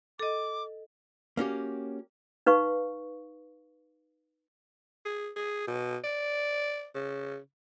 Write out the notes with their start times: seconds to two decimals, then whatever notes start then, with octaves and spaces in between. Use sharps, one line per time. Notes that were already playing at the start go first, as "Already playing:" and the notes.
0.19 A4 D#5 D6
1.37 A#3 C#4 F#4 G4
2.46 D#4 B4 F5 C#6
5.05 G#4
5.36 G#4
5.67 B2
6.04 D5
6.95 C#3